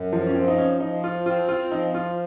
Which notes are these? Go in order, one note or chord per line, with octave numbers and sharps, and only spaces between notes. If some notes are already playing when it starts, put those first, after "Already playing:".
Already playing: F#2
F3
C#4
F3 C4
D#4
C#4
F3 D#4
F4
C4 F4
F4
F3 D#4
F4